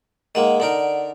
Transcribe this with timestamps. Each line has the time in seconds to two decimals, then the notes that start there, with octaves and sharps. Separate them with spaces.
0.35 D#3 G#3 A#3 D#5 F#5
0.60 D3 D#4 A#4 D5 F#5